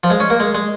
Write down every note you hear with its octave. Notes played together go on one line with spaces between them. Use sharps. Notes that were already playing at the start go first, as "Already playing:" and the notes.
F3
G#3
C#4
A#3
G#3
G#3